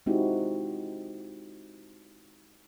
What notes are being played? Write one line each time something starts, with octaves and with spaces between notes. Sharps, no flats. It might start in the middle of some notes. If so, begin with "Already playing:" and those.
G#3 C4 D#4 E4 F#4 G4